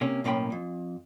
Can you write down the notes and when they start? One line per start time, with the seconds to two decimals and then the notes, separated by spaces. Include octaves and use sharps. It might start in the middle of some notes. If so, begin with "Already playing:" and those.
0.01 C3 A#3 C#4
0.24 B1 A2 A#3 C#4 G5 B5
0.52 F2